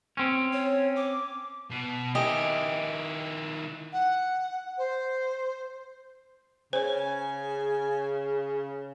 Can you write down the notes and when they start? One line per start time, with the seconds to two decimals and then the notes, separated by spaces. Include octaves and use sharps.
0.17 C4 C#4
0.53 C#5
0.96 D6
1.71 B2
2.15 D#3 E4 G4 D#5 G#5
3.93 F#5
4.78 C5
6.73 C#3 C5 C#5 G#5